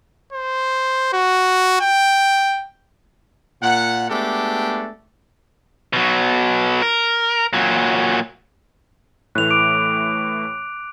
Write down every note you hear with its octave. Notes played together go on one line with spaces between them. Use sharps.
C5
F#4
G5
A#2 F#5
G#3 A3 B3 D4 G4 A4
B2 F#3
A#4
A#2 F#3
A2 E3 A3 F#6 F7
D6 D7